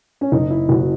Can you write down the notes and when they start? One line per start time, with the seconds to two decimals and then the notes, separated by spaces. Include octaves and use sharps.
0.21 C#4
0.32 F#1 D#4
0.50 E4
0.68 F#1 F#4
0.80 F#4